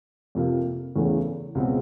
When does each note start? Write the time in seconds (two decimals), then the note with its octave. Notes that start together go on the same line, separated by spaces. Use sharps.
0.35 F2 C3 F3 A#3
0.96 E2 C#3 E3 A3
1.55 C#2 B2 G#3 C4